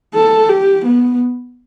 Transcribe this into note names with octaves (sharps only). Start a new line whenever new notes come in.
A4
G4
B3